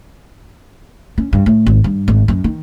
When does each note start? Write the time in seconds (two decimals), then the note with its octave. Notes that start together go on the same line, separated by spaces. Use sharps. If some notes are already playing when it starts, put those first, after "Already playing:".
1.18 C#4
1.33 G2
1.46 A2
1.66 G#1
1.84 G2
2.08 G#1
2.28 F#2
2.44 D#3